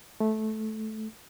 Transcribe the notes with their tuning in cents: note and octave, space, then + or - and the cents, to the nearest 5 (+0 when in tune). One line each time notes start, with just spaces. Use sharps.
A3 -15